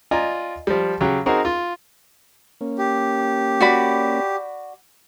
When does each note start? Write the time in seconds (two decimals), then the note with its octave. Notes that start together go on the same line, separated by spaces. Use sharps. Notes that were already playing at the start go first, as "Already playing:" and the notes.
0.11 F4 D5 D#5 G#5 A#5
0.67 F3 G3
1.01 C#3 F#3 G4
1.26 C4 D#4 F#4 G#4 A#4
1.45 F4
2.61 A#3 C#4
2.78 G4
3.61 F#4 D5 B5